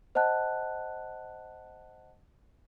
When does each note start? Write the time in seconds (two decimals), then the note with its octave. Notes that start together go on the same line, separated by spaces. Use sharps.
0.15 C5 D#5 F#5 A5 F#6